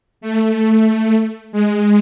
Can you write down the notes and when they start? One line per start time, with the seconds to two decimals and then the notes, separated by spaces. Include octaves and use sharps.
0.21 A3
1.52 G#3